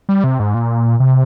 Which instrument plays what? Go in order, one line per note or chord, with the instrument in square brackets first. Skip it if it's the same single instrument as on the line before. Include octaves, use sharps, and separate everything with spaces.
[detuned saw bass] G3
C3
G#2
A#2
C3